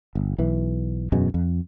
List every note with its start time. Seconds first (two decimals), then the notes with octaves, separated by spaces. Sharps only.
0.15 G1
0.38 B1 E3
1.12 E1 F#2 B2 G#3
1.34 F2